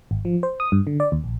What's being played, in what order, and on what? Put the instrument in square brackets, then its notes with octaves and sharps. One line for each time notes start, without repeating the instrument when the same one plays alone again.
[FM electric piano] G#1
F3
C5
D#6
G2
D3
D5
D#2
A#1